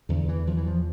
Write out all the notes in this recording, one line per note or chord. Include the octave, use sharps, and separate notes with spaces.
E2 D3
E3
E2 F3
E3
F3